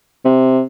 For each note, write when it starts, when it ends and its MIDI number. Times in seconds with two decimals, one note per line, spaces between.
0.25 0.62 48